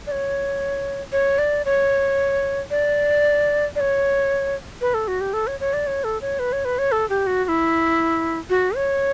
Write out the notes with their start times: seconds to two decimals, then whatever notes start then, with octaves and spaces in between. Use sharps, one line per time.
0.07 D5
0.12 C#5
1.12 C#5
1.38 D5
1.65 C#5
2.71 D5
3.76 D5
3.80 C#5
4.81 B4
4.94 A4
5.08 F#4
5.21 G4
5.33 A4
5.47 C#5
5.60 C#5
5.73 D5
5.87 C#5
6.04 A4
6.22 C#5
6.39 B4
6.53 C#5
6.65 B4
6.79 C#5
6.92 A4
7.10 G4
7.27 F#4
7.45 F#4
7.48 E4
8.50 F#4
8.76 C#5